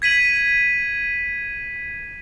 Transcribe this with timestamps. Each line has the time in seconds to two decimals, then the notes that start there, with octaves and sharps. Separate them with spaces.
0.02 G#6 B6 D#7 F#7